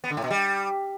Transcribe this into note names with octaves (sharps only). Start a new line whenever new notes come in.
B3
D3
A2
B2
G3